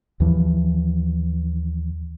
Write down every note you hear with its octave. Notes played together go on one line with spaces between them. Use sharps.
D#2 E3 F3